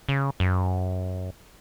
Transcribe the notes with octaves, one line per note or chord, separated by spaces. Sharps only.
C#3
F#2